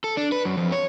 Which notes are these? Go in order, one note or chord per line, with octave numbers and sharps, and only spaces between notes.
A4
D4
B4
F#2
F2
C#5